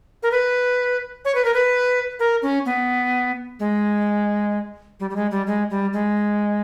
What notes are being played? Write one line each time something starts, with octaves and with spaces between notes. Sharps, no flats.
A#4
B4
C#5
B4
A#4
B4
A#4
C#4
B3
G#3
G3
G3
G#3
G3
G#3
G3
G#3